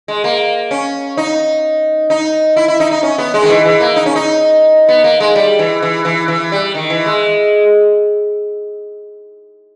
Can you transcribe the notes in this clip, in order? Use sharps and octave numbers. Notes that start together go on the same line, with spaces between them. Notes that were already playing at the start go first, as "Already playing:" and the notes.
G#3
A#3
C#4
D#4
D#4
E4
E4
D#4
D#4
C#4
B3
G#3
D#3
E3
E3
A#3
D#4
C#4
D#4
B3
A#3
G#3
G3
E3
E3
E3
E3
G3
D#3
E3
G#3